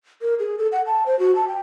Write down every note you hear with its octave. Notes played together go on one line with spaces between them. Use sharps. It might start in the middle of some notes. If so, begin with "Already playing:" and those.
A#4
G#4
A4
F#5
A5
C5
F#4
A5
G5